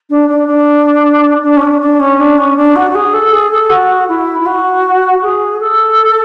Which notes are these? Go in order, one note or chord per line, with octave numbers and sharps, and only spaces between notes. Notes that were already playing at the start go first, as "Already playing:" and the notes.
D4
D4
D4
D4
C#4
D4
D4
C#4
D4
C#4
D4
F#4
F#4
G#4
A4
G#4
A4
F#4
E4
E4
F#4
G#4
A4